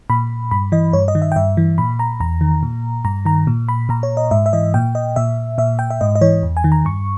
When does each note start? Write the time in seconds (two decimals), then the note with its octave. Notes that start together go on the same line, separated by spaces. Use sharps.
0.10 A#2 B5
0.51 G2 B5
0.72 E3 D#5
0.93 G2 C#5
1.08 D#5
1.15 D#3
1.22 E5
1.32 G5
1.36 G2 E5
1.57 E3
1.78 A#2 B5
1.99 A#5
2.20 E2 A#5
2.41 D#3
2.63 A#2
3.05 G2 A#5
3.25 D#3 A#5
3.47 A#2
3.69 B5
3.89 A#2 A#5
4.03 C#5
4.17 D#5
4.31 G#2 E5
4.46 E5
4.53 E3 D#5
4.74 A#2 G5
4.95 D#5
5.16 A#2 E5
5.58 A#2 E5
5.79 G5
5.90 E5
6.01 G#2 D#5
6.15 D#5
6.21 E3 C#5
6.43 E2
6.57 G#5
6.64 D#3
6.72 A#5
6.85 G2 C#6